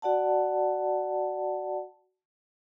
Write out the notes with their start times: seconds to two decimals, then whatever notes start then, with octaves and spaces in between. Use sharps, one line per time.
0.02 F#4 D5 F#5 A5